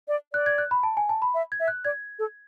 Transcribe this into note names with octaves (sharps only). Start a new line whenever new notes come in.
D5
D5 F#6
G#6
F#6
B5
A5
G#5
A5
B5
E5
G#6
E5
F#6
D5 G#6
A4